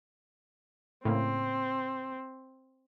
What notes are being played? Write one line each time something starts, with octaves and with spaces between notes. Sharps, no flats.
A2 C#3 A#3 C4